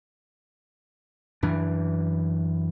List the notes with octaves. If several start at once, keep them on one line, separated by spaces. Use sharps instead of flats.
F#2 E3 D4